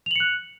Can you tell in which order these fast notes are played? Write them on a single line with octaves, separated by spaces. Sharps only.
F7 F#7 C#7 F#6